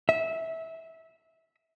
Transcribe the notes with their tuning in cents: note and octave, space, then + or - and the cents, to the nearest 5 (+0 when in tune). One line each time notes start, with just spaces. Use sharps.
E5 -20